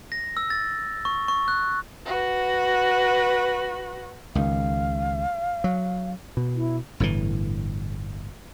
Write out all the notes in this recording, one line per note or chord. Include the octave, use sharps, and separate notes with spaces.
A#6
E6
A6
C#6
C#6
F#6
F#4 B4
C#2 D#3 F5
F#3
B2
E4
G1 A2 C#3 E3